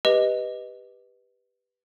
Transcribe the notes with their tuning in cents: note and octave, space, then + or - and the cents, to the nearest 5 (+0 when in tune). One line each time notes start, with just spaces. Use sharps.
G4 +10 B4 +0 D#5 +0